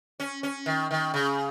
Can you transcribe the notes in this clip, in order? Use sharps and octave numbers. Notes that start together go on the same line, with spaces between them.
C#4
C#4
D#3
D#3
C#3